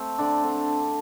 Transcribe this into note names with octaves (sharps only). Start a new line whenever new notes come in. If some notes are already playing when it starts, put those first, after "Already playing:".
Already playing: A3 C4
D3 D4
D3 C4